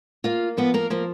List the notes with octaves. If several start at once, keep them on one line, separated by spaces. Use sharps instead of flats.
A#3 F4 F5
F3 B3 B4
A#3 A#4
F3 A#3 A#4